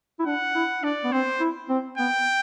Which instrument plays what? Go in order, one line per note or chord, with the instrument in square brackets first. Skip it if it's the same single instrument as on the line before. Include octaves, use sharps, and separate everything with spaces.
[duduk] E4
[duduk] D4 [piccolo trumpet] F#5
[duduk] E4
[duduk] D4 [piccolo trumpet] D5
[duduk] B3
[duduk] C4 [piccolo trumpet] C5
[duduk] E4
C4
[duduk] B3 [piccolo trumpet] G5